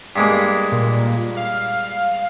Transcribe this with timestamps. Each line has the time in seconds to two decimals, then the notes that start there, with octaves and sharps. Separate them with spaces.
0.16 G2 G#3 A#3
0.72 A#2
1.37 F5